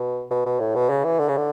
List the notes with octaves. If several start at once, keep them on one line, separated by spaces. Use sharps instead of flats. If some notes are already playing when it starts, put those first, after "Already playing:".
Already playing: B2
B2
B2
A2
B2
C#3
E3
D3
C#3
D3